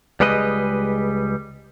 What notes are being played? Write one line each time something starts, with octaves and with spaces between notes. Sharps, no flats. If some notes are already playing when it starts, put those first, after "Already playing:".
C#2 G3 G#3 B4 D#5